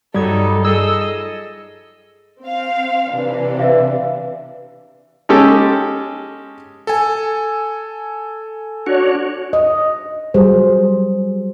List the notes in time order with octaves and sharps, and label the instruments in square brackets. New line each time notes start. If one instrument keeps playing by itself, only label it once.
[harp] G2 D#6 G#6 [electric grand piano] F#3 [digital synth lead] G3 [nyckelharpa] D#4 A4
[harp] F4 G#6 [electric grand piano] G#4 A4 [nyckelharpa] D#5 [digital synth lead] E6
[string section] C4 F5
C3 E3 D4
[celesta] B4 E5 F5
[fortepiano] G#3 C#4 G4 A4
[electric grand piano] A4 G#5
[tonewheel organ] D4 F#4 C#5
[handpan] D#5
F#3 G3 G#4 C5